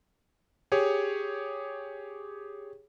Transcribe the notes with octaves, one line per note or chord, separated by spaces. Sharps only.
G4 G#4 C#5